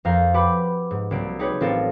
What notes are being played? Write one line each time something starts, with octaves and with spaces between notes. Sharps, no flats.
F2 A#4 F5 A#5 G6
G4 B4 F#5 B5 D6
G#2
C2 F#3 A#3 D7
D#4 G4 G#4 B4 C#5
A1 C4 F4 A4 A#4